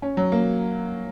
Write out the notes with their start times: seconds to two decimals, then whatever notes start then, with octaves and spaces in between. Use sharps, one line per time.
0.02 C#4
0.17 F#3
0.32 A#3